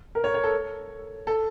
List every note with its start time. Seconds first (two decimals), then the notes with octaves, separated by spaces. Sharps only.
0.15 A#4
0.24 C#5
0.34 C#5
0.44 A4
1.27 A4